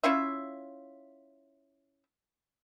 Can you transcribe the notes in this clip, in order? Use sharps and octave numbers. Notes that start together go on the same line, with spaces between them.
C#4 E4 F4 E5